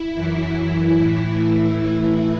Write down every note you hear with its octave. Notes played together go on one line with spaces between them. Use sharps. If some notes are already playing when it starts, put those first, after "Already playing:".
Already playing: E4
F#2 E3
E4
A2 E3
A2 E3